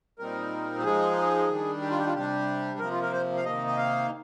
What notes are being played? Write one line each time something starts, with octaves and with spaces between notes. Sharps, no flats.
A#2 G3 C4 D#4 A#4
G4
F3 G#3 D#4 G#4
D#3 G3 D4
G4
F4
G4
F4
C3 G3 D4 G4
C3 F3 A#3 A#4
F4
A#4
C5
F5
C3 D#3 A#3 D#4 D#5
D#5
F5